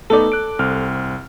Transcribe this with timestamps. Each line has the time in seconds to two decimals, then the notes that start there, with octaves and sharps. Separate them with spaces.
0.10 A3 B3 D#4 A4 D5
0.32 F#6 D7
0.59 C2 C4 F6